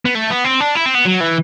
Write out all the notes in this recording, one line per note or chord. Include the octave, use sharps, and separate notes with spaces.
B3
A3
B3
C4
D4
E4
C4
B3
F#3
E3